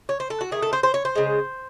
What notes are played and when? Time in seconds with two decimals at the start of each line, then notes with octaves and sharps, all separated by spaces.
0.09 C#5
0.20 C5
0.30 A4
0.41 F#4
0.51 D#3 A3 G#4
0.62 A4
0.73 C5
0.83 C5
0.94 C#5
1.05 C5
1.15 C#3 G#3